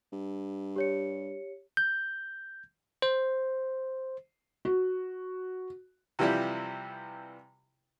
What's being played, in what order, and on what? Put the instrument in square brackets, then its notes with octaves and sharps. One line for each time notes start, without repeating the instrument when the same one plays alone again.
[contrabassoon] G2
[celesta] G4 C#5 C#7
[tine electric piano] G6
C5
[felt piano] F#4
[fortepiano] C3 E3 F3 G3 E4 G4